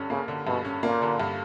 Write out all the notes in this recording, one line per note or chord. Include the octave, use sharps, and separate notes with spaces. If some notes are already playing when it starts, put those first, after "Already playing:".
Already playing: G2 D3 C#4
C#3 A#3
D3
G2 B2
C#4
A#2 A#3
D3
G2